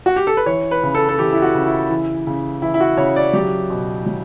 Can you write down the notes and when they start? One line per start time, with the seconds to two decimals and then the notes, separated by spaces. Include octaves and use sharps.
0.06 F#4
0.16 G4
0.27 A4
0.37 B4
0.46 E3 C#5
0.71 B4
0.83 C#3
0.95 A4
1.09 A4
1.18 E3 G4
1.33 E4
1.42 F#4
1.54 C#3
1.67 E4
1.90 E3
2.27 C#3
2.62 E3 E4
2.74 E4
2.80 F#4
2.97 C#3 C#5
3.16 D5
3.33 F#3 G4
3.70 B2
4.06 F#3